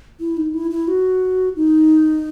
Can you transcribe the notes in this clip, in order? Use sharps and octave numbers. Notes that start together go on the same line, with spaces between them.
E4
D#4
E4
E4
F#4
D#4